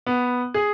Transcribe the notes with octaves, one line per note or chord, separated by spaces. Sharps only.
B3
G#4